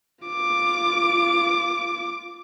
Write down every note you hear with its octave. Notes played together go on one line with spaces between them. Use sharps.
F4 D6